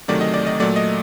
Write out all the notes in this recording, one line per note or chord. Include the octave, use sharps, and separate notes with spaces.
D2 C3 D#3 F#3 A3 D5
D#5
D5
D#5
A#2 F#3 A3 D5
D#5